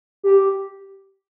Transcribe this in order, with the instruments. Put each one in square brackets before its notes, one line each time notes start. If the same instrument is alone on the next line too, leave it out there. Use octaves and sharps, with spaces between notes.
[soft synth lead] G4